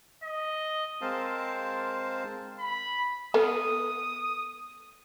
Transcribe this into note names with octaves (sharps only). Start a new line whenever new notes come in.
D#5
G#3 C4 A#4 C5 F5 A5
B5
B3 A4 D#6